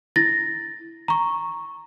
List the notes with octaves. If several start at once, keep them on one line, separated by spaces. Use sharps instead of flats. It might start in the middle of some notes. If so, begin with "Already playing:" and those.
E4 A6 A#6
A#5 C#6